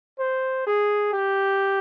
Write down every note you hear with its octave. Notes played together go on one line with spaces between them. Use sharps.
C5
G#4
G4